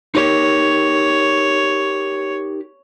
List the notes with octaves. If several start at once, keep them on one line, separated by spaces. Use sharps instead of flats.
D#4 G4 A#4 C#5